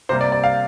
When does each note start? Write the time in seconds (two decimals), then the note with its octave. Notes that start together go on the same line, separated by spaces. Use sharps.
0.09 C3 G3 A#3 C5
0.21 D5
0.32 D5
0.44 F5